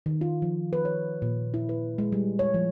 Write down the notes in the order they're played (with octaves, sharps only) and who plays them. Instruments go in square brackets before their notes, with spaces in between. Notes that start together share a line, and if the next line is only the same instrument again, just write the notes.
[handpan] D#3
F4
F3
B4
C#5
A#2
E4
B4
G#3
G3
C#5
F3